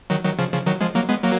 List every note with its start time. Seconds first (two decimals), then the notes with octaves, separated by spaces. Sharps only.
0.10 D#3 F#3
0.24 D#3 F#3
0.39 C#3 F3
0.52 C#3 F3
0.66 D#3 F#3
0.81 F3 G#3
0.95 F#3 A#3
1.09 G#3 B3
1.23 F#3 A#3